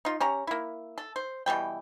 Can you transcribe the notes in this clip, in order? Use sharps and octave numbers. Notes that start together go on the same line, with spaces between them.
D#4 F4
C#4 G4 A#5
A#3 E4
A4
C5
B2 E3 G3 G5